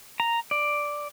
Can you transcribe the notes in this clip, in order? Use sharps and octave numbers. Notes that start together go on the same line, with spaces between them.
A#5
D5